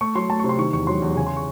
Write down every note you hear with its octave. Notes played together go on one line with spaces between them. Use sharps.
A3 C#6
F#3 C6
A3 A5
C#6
C3
C6
D#3 C#6
E2 C#6
F#3 C6
E2
C#3 G#5
C6
C#6